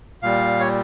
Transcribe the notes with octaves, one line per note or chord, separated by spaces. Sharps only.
A#2 G3 F5
C#5